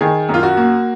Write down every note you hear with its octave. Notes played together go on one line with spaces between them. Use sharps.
D#3 G#4
F#2
F4
F#4
A#3